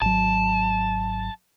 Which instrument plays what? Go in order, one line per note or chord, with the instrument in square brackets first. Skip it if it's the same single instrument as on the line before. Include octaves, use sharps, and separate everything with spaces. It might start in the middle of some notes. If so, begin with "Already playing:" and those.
[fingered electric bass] G#1 F#3 [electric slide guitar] A5